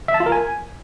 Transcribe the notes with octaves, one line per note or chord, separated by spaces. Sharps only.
E5
A5
F4
A#4
G#5